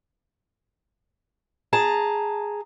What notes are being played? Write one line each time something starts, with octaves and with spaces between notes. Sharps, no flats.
G#4 A5 A#5